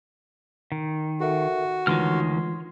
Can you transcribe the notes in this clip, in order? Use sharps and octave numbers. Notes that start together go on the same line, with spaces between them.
D#3
F#4 A4 A#4 E5
D2 D#3 E3 G#3 F4 C#5 C6 F6